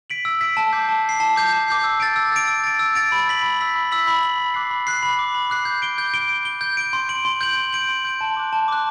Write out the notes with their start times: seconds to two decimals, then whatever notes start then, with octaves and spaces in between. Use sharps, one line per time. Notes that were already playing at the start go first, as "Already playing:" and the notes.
0.10 B6 D7 F#7
0.25 E6
0.41 B6 D7 F#7
0.57 A5
0.73 D6 G6 C7
0.88 A5
1.04 D6 G6 C7
1.20 A5
1.36 D6 G6 C7
1.53 A5
1.68 D6 G6 C7
1.84 E6
2.00 A6 D7
2.16 E6
2.32 A6 D7
2.48 E6
2.64 A6 D7
2.79 E6
2.95 A6 D7
3.12 B5
3.27 E6 B6 F#7
3.43 B5
3.59 E6 B6 F#7
3.76 B5
3.91 E6 B6 F#7
4.07 B5
4.23 E6 B6 F#7
4.38 B5
4.54 D6 F#6 C7
4.70 B5
4.87 D6 F#6 C7
5.03 B5
5.19 D6 F#6 C7
5.34 B5
5.50 D6 F#6 C7
5.65 G6
5.82 D7 G7
5.98 G6
6.14 D7 G7
6.29 G6
6.45 D7 G7
6.61 G6
6.77 D7 G7
6.93 C6
7.09 G6 D7 F#7
7.25 C6
7.41 G6 D7 F#7
7.57 C6
7.73 G6 D7 F#7
7.89 C6
8.05 G6 D7 F#7
8.21 A5
8.37 D6 F#6
8.53 A5
8.68 D6 F#6